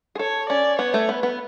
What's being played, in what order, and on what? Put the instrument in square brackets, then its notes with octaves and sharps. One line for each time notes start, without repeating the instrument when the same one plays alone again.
[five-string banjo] G#4
[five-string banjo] A4 [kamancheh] C#5
[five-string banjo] C#4 [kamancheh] D5
[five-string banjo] B3 [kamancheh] C#5
[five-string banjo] A3
[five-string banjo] B3 [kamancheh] B4
[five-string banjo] B3